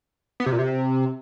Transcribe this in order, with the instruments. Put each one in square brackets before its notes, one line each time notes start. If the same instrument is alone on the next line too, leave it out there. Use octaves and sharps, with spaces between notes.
[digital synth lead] B3
C3
A#2
C3